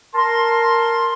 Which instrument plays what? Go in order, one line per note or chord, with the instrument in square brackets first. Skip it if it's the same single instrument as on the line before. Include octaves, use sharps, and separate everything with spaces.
[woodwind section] A#4 A5 C6